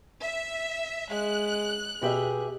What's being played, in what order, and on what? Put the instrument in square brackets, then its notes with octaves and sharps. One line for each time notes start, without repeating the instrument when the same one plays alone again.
[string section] E5
[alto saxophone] G#3 [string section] F#6
[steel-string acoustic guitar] B2 G4 E5 [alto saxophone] G#4